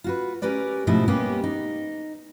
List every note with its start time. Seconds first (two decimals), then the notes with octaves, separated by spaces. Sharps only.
0.04 F4 F#4 B4
0.42 C#4 G4 A#4 B4 D5
0.87 G#2 B2 F3 A3 D#4 E4
1.07 G3 G#3 A#3 B3 C#4 G4
1.44 D#4